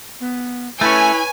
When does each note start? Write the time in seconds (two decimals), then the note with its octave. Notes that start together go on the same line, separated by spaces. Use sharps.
0.21 B3
0.81 A3 C#4 E4 B4 C#5 G#5